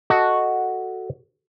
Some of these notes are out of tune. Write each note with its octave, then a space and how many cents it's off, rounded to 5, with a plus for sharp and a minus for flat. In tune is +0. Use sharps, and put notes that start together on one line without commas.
F#4 +0 A4 +0 D#5 +0